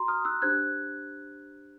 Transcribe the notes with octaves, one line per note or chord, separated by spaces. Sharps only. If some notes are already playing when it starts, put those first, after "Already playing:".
Already playing: F#4 A#5 C6
D#6 F6
E6 F#6
D4 G4 C5 F#6 G#6